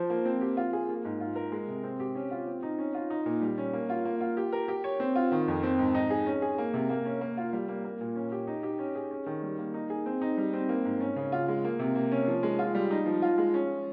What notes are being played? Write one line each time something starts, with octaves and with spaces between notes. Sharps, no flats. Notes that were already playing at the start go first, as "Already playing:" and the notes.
Already playing: F3 C5
A#3
C4
G4
F4
G#4
A#3
G#2
F4
A#4
G#3
C3
C4
G4
C#4
F4
C4
D#4
C#4
F4
D#4
A#2
G3
C#4
A#3
F4
A#3
F4
G4
A#4
G4
C#5
C4
F4
D#3
F2
C4
G#2
D#4
G#4
C#4
G#4
A#3
C3
A#3
C#4
A#3
F4
G3
A#3
A#3
A#2
C#4
G4
D#4
G4
C#4
G#4
C#4
D#3
G3
A#3
D#4
G#4
C4
D#4
G3
C4
A#3
G#2
C#4
C#3
F4
G#3
A#3
C3
A#3
C#4
F3
G#3
F4
G3
D#4
F3
F4
G#3
C#4